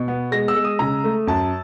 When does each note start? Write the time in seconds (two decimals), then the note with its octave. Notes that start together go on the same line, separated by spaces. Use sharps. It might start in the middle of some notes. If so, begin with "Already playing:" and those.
Already playing: B2
0.08 B3
0.32 G#3 A#6
0.48 E6
0.55 G#3
0.64 D#6
0.79 C#3 A#5
1.04 A3
1.27 F#2 A5